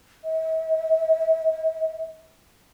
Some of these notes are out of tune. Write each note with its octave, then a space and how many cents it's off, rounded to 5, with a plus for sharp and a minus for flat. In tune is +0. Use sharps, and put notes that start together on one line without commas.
E5 -45